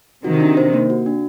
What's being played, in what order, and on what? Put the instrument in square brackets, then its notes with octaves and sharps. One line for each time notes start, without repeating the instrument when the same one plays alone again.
[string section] C3 D#3 [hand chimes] F#4
[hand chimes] D4
C5
A#3
F#4
D4